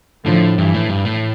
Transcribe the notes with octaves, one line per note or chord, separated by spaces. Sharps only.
A2 D3 F3
G2 E3
A2
G2
A2